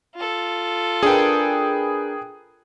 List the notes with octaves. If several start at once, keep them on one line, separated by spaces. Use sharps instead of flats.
F4 A4
D4 G#4 A#4 B4 G5